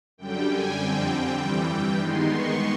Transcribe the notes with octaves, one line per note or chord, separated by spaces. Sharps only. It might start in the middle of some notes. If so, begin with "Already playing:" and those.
F#2 D3 G3 G5
G#5
F2 D3 G3 C4 G5
G2 E3 G3
G5
D#3 G#3 B3 D#4 C6
C#6